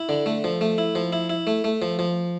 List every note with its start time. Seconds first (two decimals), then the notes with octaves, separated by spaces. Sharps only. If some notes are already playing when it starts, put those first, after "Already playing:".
Already playing: E4
0.09 D3
0.26 A3
0.44 F3
0.61 A3
0.78 E4
0.95 F3
1.13 E4
1.30 E4
1.47 A3
1.64 A3
1.82 F3
1.99 F3